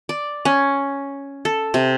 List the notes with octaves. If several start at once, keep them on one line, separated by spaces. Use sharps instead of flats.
D5
C#4
A4
C3